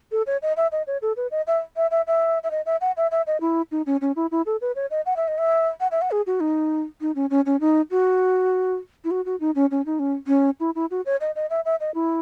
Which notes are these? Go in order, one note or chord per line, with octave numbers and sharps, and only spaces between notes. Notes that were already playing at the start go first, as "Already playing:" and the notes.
A4
C#5
D#5
E5
D#5
C#5
A4
B4
D#5
E5
E5
E5
E5
E5
D#5
E5
F#5
E5
E5
D#5
E4
D#4
C#4
C#4
E4
E4
A4
B4
C#5
D#5
F#5
E5
D#5
E5
F#5
E5
F#5
G#4
F#4
D#4
D#4
C#4
C#4
C#4
D#4
F#4
E4
F#4
F#4
D#4
C#4
C#4
D#4
C#4
C#4
E4
E4
F#4
C#5
D#5
D#5
E5
E5
D#5
E4